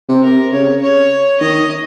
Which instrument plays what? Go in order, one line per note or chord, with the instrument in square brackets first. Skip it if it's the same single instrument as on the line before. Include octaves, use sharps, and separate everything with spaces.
[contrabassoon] C3
[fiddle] A#4
[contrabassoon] C#3 [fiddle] C#5
[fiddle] C#5
[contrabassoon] D#3 [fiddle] D#5